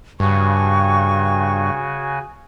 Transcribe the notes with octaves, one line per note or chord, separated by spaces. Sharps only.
G2 C#3 F#4 G#5 C#6